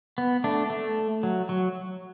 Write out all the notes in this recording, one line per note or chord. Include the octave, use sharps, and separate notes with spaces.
B3
A3 D4
A3
F#3
F#3